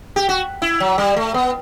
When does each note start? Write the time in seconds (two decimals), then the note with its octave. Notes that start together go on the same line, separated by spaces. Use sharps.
0.16 G4
0.29 F#4
0.62 E4
0.80 F#3
0.98 G3
1.16 A3
1.34 B3